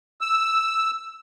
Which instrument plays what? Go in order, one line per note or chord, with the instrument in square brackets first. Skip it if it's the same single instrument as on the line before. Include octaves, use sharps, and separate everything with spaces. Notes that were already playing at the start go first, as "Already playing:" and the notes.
[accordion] E6